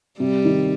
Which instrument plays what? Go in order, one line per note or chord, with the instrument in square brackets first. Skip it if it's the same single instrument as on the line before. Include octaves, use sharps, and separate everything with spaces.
[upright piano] C3 [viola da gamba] G3
[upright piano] D#3